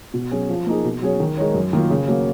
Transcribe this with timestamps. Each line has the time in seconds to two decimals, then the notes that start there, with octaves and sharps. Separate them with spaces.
0.14 B2
0.31 F#3 C#4 G#4
0.50 F3
0.66 A#3 D#4 G#4
0.84 B2
1.02 F#3 C#4 G#4 C#5
1.20 D#3
1.37 G#3 D#4 A#4 C#5
1.54 F#2
1.73 D#3 A#3 F4
1.90 C#3
2.08 F#3 A#3